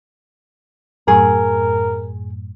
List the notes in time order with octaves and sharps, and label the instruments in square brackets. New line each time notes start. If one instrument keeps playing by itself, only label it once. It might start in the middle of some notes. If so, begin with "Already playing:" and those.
[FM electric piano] F#2 A2 [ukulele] G#4 [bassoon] A#4